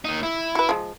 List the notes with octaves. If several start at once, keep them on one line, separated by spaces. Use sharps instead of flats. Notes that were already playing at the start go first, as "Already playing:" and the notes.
A#3 D#4
E4
F#4 B4
F3 G#3